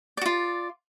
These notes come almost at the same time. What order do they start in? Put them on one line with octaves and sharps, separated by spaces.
D5 F#4 F4